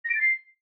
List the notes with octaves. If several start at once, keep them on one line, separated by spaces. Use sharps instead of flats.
A#6
D7
A6
C7